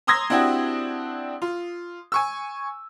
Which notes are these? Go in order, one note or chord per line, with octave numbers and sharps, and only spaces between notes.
A#5 C6 D#6 E6 G#6 A#6
C4 D4 E4 F#4 G4
F4
G#5 C#6 E6